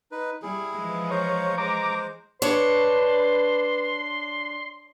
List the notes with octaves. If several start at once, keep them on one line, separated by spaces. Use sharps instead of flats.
D#4 B4
G3 E4 G#4
E3 F3 G#3
C5 C#5 F5 A#5
G#3 C5 A#5 D6
D4 B4 C#5 C6